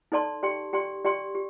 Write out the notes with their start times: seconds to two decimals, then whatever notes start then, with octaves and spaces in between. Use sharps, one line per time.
0.12 D#4 A4 D5 A5 C6
0.43 G4 D5 G5 C6
0.73 G4 D5 G5 C6
1.05 G4 D5 G5 C6
1.35 G4